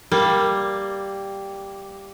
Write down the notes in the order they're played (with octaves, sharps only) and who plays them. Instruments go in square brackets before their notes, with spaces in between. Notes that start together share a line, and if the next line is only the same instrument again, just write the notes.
[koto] G3 A#3